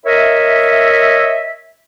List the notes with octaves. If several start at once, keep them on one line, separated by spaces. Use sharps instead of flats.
A#4 C#5 D#5 E5